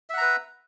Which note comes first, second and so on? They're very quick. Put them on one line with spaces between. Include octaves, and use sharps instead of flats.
E5 F#5 A#5 B4